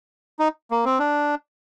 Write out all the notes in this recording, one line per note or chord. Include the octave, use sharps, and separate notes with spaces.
D#4
A#3
C4
D4